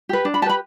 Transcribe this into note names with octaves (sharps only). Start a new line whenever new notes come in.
G4 B4
D4
B5
G4 B4 A5 B5